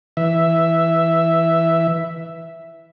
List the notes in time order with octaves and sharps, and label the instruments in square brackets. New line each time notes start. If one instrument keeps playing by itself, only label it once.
[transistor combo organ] E3 E5